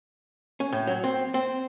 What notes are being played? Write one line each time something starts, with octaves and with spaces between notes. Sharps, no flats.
C#4
A2
F#3
C4
C4